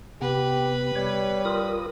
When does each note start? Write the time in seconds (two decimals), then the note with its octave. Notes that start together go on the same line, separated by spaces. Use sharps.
0.22 C3 B3 G4 B4
0.95 G3 C#5
1.45 F4 A#4 D#6